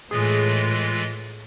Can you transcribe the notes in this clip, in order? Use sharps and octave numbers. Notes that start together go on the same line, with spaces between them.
A2 E3 G#3 F4 G#4